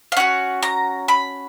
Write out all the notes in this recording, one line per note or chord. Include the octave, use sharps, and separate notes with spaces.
F5
C#4 F#4 F#5
A#5
B5